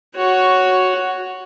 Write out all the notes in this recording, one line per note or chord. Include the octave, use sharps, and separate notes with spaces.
F#4 C#5